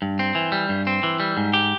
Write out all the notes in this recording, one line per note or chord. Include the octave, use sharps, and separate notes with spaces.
G2
C4
E3
G3
G2
C4
E3
G3
G#2
G4